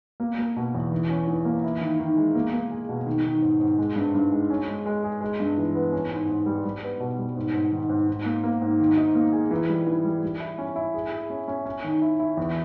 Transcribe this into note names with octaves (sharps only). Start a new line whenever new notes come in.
A#3
A#3
B2
E2
E3
C#4
E3
A#3
E4
D#3
D#3
G#3
A#3
A#3
G#4
B2
D#3
D#3
G#2
G#2
G#3
G2
G2
G#3
C#4
G#3
G#3
G#4
G#3
G2
E3
B3
C#4
G#2
G#2
G3
G3
B3
B2
G3
G#2
G#2
D#3
G#2
G#2
A#3
A#3
G#2
D#3
D#4
A#3
G#4
E3
G3
E3
G3
G3
E4
C#4
E4
G#4
G#4
C#4
C#4
C#4
D#3
E4
E4
E2